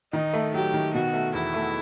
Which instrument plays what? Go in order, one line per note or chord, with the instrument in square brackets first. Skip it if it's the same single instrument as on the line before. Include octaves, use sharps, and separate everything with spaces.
[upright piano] D#3 [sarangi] D#4
[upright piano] A3
[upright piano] F#3 [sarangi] G4
[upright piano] D#3
[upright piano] B2 [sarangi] F#4
[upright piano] A3
[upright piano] E2 [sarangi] E4
[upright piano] A3